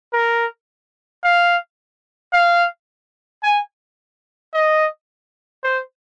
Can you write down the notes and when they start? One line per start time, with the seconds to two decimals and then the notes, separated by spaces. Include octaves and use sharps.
0.13 A#4
1.23 F5
2.33 F5
3.43 G#5
4.54 D#5
5.64 C5